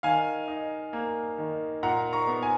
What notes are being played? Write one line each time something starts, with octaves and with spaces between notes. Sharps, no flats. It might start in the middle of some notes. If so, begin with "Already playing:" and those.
D#3 F5 G#5
D#4
A#3
D#3
A#2 F#5 A#5
A#5 C#6
B3
G#5